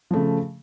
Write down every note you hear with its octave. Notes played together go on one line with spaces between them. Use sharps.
C#3 F3 A3